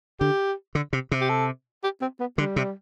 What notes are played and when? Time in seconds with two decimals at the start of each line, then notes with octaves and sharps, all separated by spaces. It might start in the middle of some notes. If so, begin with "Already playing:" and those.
0.20 D3 G4
0.75 D3
0.93 C3
1.11 C3
1.21 G4
1.29 A4
1.83 G4
2.01 C4
2.20 B3
2.38 D3 G3
2.56 C3